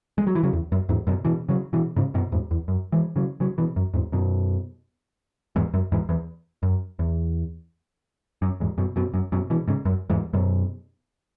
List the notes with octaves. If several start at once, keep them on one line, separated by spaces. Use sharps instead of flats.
G#3
F#3
E3
C#3 F#3
E2
F#2
E2 G#2
F#2 B2
B2 E3
C#3 F#3
B2 E3
G#2 C#3
F#2 B2
E2 G#2
E2
F#2
E3 G#3
C#3 F#3
C#3 F#3
B2 E3
F#2
E2 G#2
F#2 B2
E2 G#2
F#2
E2 G#2
E2
F#2
E2
F#2
E2 G#2
F#2 B2
F#2 B2
F#2
F#2 B2
B2 E3
G#2 C#3
F#2
E2 G#2
F#2 B2